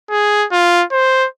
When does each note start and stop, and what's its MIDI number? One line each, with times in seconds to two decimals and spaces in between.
0.11 0.46 68
0.52 0.84 65
0.92 1.27 72